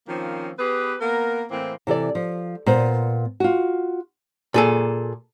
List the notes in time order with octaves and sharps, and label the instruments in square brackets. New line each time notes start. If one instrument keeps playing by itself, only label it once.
[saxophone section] D#3 F3 A#3 C4 C#4
B3 G4 G#4 B4
A#3 B3 A#4
A2 E3 A#3 C4
[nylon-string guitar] C3 E3 A4 D5
F3
A#2 B3 C5
F4 F#4
[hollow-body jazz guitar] A#2 G#4 A4